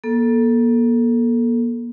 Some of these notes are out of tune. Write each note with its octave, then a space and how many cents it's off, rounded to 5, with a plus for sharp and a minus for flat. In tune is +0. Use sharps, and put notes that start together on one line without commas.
A#3 +35 A4 +0